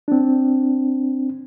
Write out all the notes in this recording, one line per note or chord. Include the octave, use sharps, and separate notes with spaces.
C4 D4